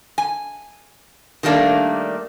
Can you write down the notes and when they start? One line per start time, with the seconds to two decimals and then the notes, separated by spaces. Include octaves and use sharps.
0.18 G#5
1.43 D#3 G3 A3 A#3 D4